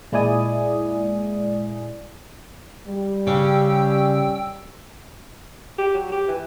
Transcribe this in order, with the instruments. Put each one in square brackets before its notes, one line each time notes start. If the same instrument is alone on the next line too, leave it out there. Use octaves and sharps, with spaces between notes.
[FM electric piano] A#2 G#3 E4 D5 G#5 D#6
[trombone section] G3
[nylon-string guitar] C#3 [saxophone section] C#4 G4 [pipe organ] G5 E6
[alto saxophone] G4
F#3
G4
E3